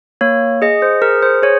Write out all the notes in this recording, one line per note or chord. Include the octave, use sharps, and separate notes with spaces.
A#3 C#5
G#4 D#5
C5
G#4 A#4
C5
G#4 C#5